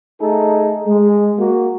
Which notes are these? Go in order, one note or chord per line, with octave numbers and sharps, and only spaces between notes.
A3 D#4 G#4 A4
G#3
A#3 F#4